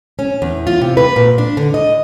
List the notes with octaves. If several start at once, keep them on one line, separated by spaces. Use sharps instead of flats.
C#4
E2
F4
C3
B4
A#2
D4
D3
D#5